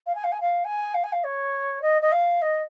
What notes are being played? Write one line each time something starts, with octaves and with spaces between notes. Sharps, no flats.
F5
G#5
F5
G#5
F5
G#5
F5
G#5
F5
C#5
D#5
D#5
F5
D#5